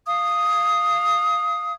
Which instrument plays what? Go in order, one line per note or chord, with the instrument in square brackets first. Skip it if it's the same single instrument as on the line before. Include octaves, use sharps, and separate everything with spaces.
[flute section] F5 D#6